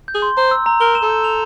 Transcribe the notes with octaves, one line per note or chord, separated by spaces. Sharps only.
G6
G#4
C6
C5 A#5
E6
A#5
A#4 G7
E7
A4
G6
F7